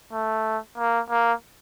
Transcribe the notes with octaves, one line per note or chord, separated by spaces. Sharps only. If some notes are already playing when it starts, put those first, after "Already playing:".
A3
A#3
A#3